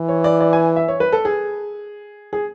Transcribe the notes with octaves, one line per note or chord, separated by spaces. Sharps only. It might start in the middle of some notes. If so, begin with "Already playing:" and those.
Already playing: E3
C#5
D5
D5
G#5
E5
C#5
B4
A4
G#4
G#4